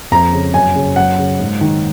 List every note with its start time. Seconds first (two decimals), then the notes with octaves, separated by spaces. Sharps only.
0.11 F2 A#5
0.33 C#3
0.54 F#2 G#5
0.75 C#3
0.96 F#2 F#5
1.19 C#3
1.40 G#2
1.61 D#3